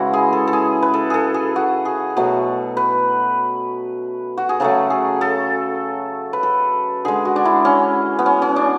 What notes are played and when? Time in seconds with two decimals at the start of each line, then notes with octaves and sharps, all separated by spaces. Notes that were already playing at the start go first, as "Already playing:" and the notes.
Already playing: C#3 E3 G#3 E4 F#4
0.13 G#4
0.33 A4
0.47 A4
0.53 G#4
0.82 B4
0.94 A4
1.10 G#4 A4
1.34 G#4
1.56 F#4
1.85 G#4
2.17 B2 F#3 A3
2.77 B4
4.38 F#4
4.49 G#4
4.60 C#3 F#3 A3 A4
4.90 G#4
5.21 A4
6.33 B4
6.43 A4
7.05 D3 G#3 G#4
7.25 F#4
7.36 D4
7.45 E4
7.65 C#4
8.19 B3
8.26 C#4
8.42 C#4
8.56 D4